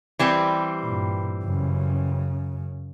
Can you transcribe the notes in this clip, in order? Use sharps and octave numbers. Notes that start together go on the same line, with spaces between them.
E3 G3 C4
G2 A#2
F#2 C#3